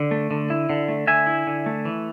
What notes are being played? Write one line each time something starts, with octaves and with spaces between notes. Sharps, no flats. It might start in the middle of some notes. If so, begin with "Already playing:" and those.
Already playing: D3
A3
D3
E4
D3
A3
D3 E5 G#5
E4
D3
A3
E3